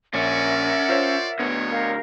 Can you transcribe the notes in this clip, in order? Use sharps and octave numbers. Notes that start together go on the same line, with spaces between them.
A#1 C#4 A#4 D5 E5 F#5
F4 C5 C#5
A2 D3 B3 C#5
A#4 F5 G5